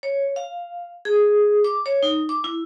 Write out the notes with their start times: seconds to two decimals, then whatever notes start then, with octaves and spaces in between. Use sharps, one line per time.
0.03 C#5
0.36 F5
1.05 G#4
1.64 D6
1.86 C#5
2.03 D#4
2.29 D6
2.44 E4